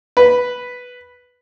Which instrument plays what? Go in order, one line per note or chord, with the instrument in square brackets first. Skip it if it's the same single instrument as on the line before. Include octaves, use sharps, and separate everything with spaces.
[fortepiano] B4